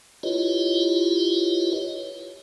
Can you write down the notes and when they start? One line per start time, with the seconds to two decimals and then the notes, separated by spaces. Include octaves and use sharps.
0.23 E4 F4 G4 B4 C#5 D#5